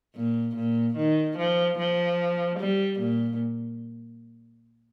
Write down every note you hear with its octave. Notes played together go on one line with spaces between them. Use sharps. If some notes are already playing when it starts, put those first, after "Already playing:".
A#2
A#2
D#3
F3
F3
G3
A#2